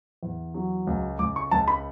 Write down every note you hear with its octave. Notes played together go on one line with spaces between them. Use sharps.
E2
F#3
C#2
C#2 D6
C#6
C#2 A5
B5